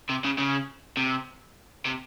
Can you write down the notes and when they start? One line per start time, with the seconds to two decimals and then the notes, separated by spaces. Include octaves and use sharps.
0.10 C3
0.25 C#3
0.38 C#3
0.97 C3
1.85 C3